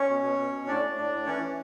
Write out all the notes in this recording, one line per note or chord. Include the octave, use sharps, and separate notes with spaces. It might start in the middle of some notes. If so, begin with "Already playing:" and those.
Already playing: C#4 C#5
B2
B2
B2
B2
A2 D4 D5
A2
A2
A2
E3 C#4 C#5
E3